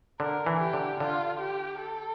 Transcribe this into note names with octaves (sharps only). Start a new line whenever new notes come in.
D3 A#4
E3
G4
D3
D3 F4
G4
A4